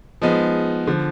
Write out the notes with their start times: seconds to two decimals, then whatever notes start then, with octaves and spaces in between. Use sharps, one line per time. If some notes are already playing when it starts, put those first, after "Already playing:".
0.22 F3 G#3 B3 D#4
0.87 D3 F3